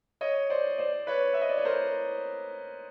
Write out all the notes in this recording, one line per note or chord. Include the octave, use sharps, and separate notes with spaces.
C#5 D#5
C5 D5
C5 D5
B4 C#5
E5
D#5
D5
C#5
A#4 C5